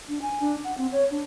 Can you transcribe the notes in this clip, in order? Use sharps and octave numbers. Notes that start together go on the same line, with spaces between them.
D4
G#5
D4
F#5
C4
C#5
D4